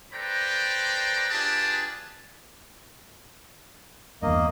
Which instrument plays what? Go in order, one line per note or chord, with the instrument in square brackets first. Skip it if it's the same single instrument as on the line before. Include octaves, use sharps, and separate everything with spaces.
[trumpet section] A4 B4 C5 D5 G5 A#5
D4 F4 G4 G#4 B4 A5
[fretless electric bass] E2 G2 [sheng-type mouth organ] A#3 D#5